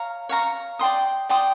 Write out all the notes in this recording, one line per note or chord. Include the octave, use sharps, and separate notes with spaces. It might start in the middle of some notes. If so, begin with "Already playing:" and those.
Already playing: C#5 F5 A#5
C#5 F5 A#5 C#6
D5 G5 C6 D#6
D5 G5 C6 D#6